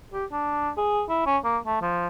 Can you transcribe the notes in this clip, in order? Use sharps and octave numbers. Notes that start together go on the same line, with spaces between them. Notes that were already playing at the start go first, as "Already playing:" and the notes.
G4
D4
G#4
E4
C#4
A#3
A3
F3